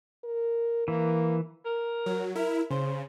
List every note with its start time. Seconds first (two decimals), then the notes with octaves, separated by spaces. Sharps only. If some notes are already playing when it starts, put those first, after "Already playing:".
0.24 A#4
0.88 E3 A#3
1.65 A#4
2.06 F#3
2.35 E4 A#4
2.70 C#3 C5